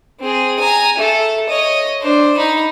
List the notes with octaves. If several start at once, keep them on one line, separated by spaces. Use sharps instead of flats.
C4 G#4
G#5 A#5
A3 A4
C#5 D#5
D4 C5
D#4 B5